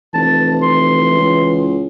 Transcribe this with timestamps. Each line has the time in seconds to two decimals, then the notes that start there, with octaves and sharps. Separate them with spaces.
0.14 F1 E3 A5
0.62 C6
1.15 C#2